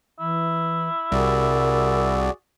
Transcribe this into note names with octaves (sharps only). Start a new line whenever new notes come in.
E3 E4
C2 F#4 G#4 A#4 D5